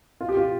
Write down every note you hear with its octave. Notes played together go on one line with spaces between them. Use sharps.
F4
G4
F4